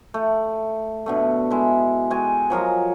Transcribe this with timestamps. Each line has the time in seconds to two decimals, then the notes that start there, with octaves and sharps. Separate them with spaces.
0.14 A3
1.06 B2 D3 A3
1.50 G#3 E4
2.10 G#3 F#4 G5 G#5
2.50 F3 F#3 A#4 D#5